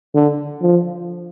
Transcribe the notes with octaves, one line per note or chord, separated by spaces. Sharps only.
D3
F3